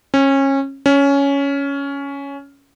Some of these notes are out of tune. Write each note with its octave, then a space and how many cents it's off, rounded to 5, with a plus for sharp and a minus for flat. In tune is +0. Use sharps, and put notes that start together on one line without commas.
C#4 -25
C#4 +10